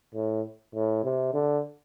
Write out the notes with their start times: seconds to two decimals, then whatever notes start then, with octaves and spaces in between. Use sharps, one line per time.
0.14 A2
0.74 A2
1.04 C3
1.34 D3